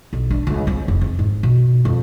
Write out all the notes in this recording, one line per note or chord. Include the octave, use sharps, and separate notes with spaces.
B1
D4
C#2
C4
F1
C4
G#2
B2
F2